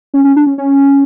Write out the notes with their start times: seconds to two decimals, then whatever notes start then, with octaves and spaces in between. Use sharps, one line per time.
0.14 C#4
0.24 C#4
0.36 D4
0.47 C#4
0.58 C#4